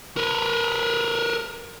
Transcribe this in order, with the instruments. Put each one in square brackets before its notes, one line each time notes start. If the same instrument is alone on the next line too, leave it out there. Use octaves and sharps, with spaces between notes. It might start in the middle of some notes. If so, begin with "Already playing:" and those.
[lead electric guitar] A#4 B4